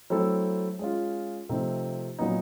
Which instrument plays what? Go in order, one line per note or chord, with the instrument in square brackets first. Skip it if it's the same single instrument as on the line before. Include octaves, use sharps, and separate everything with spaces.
[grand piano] F#3 A3 C4 E4 A4
G#3 C#4 F4
C3 F3 A3 C4 D#4
A#2 F#3 B3 D#4